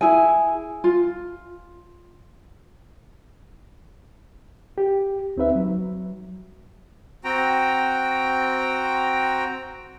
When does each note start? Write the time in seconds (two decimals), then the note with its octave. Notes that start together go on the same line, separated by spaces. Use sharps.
0.01 E4 G#4 G#5
0.84 F4
4.78 G4
5.37 D2 C4 D#4 B4 E5
5.55 F#3
7.24 C4 F#4 G5 A#5